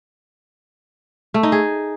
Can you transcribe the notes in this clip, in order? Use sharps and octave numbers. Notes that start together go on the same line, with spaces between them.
A3
D#4
G#4